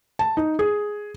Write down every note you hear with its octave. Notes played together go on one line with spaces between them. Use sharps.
A5
D#4
G#4